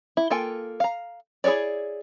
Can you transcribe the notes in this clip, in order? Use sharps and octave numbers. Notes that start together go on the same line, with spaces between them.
E4
A#3 F4 A4 G5 G#5
F5 A#5
E4 G#4 B4 C#5 D5